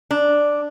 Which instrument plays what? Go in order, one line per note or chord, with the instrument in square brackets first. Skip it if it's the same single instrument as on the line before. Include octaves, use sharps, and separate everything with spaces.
[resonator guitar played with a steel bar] D4